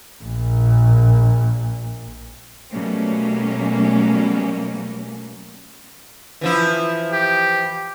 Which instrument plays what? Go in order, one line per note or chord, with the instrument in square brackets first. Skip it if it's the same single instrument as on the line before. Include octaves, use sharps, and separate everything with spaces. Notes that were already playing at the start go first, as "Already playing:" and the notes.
[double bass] A#1 A#2
[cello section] B2 F#3 G3 A3 A#3 C#4
[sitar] E3 F3 E4
[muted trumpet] G4